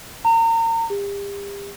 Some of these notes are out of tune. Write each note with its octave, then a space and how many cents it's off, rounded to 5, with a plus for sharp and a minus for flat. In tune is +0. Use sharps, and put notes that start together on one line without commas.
A#5 -35
G4 +40